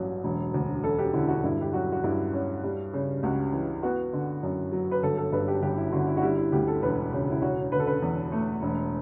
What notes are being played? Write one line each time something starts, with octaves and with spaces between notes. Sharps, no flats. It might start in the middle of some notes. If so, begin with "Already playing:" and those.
Already playing: A1 G2 F#3
E1
D2
E1 A4
G4
D3 E4
F#4
G2 E4
G4
F#3 F#4
F#4
G2 E4
C#4
G3
C#3
C#2 F#4
E3
B3 F#4
D3
F#2
F#3
B4
G1 A4
A4
G2 B4
G4
G1 G4
E4
D3 F#4
E4
F#4
G3 E4
E4
D2 G4
A4
E1 B4
C#3
E4
C#4 F#4
D3 B4
A4
B4
E2
A3
E1